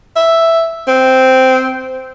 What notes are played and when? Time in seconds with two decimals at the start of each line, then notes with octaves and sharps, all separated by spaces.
0.16 E5
0.88 C4